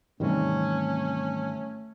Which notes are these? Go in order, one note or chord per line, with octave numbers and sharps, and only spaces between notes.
G#2 C3 D#3 E3 G3 A3 C4 C#4